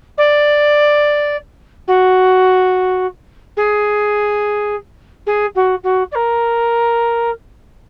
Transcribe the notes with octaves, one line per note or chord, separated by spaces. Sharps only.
D5
F#4
G#4
G#4
F#4
F#4
D5
A#4